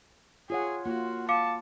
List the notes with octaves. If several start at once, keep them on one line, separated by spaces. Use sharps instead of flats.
F4 G#4 C#5 F#5
A#3 F4 F#4
F5 A5 D6 C#7